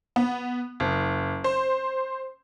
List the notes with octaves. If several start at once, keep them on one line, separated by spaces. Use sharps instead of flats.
B3
F#1
C5